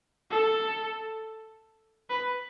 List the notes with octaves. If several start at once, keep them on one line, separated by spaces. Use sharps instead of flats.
A4
B4